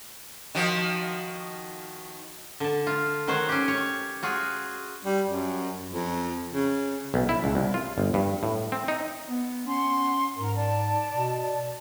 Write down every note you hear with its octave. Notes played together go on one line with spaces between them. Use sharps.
D#3 F3 F#4
D3 A5
F4
D#3 F#3 F#4 C5 C#5
C#4 G4
C#5
F4 F#4 G#4
G3
F#2
F2
C#3
B1
E4
C#2
C2
F4
G1
G2
A2
C4
D#4
B3
C#4 F#5 C6
G#2 A#4
D5 A5
B2